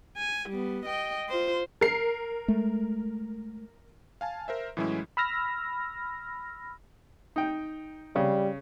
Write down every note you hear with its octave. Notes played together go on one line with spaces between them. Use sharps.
G#5
G3 B3
D#5 G5
F4 C5
A#4 C7
G#3 A3
F5 G#5 A5
A#4 C5 E5
A2 E3 F#3 G#3 C#4 E4
B5 E6 F6 A#6
D#4 G5
C#3 G3